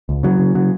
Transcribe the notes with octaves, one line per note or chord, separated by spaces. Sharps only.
C#2
C#3 F#3
C#3
C#3 F#3